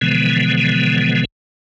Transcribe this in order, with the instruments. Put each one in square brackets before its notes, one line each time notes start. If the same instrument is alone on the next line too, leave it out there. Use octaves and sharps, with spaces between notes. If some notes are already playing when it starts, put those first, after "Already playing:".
[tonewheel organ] B2 D3 E3 F3 G#3 B3